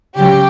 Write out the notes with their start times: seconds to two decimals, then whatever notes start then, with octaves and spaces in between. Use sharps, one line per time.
0.16 C#3 F#3 G4